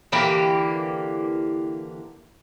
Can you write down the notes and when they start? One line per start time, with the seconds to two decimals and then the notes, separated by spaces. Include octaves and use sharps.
0.12 D3 E3 A#3 G4